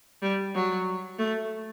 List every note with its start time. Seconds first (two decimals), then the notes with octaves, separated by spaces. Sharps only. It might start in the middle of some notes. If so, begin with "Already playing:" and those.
0.22 G3
0.55 F#3
1.19 A3